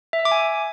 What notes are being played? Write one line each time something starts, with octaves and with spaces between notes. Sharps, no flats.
E5
E6
D6
G#5